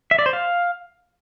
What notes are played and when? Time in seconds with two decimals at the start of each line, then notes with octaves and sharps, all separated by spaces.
0.11 E5
0.19 D5
0.26 C5
0.33 F5